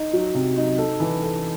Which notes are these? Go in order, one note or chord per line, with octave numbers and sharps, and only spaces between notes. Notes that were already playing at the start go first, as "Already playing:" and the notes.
Already playing: D#4
F#3
C3
D#4
A4
E3
A4